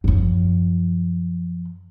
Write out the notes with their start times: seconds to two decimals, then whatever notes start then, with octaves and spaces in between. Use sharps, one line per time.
0.04 F#2 F3